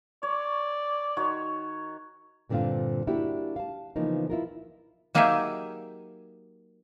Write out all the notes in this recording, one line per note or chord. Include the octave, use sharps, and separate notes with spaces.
C#5 D5
D#3 F#4 C#5
G2 A#2 D3 C4 D4 F4
A#3 D4 E4 F#4 G4
F5 A5
C#3 E3 F3 A#3 B3 D#4
E4 F4 A#4
F#3 A#3 D#4 G4 G#4 E5